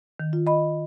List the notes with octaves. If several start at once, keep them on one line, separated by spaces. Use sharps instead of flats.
D#3
F4
D#5 B5